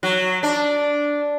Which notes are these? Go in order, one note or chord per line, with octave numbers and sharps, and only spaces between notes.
F#3
D4